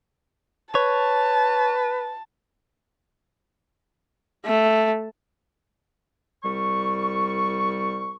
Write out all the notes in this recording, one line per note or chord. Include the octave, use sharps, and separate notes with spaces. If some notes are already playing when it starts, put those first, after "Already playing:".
B4 C#5 A5
A3
C2 G3 C#6